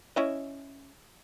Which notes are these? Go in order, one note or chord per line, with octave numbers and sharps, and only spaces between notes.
C#4 E4 D#5